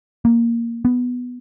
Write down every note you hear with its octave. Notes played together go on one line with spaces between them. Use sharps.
A#3
B3